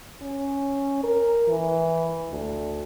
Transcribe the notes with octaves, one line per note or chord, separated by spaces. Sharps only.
C#4
A#4
E3
D2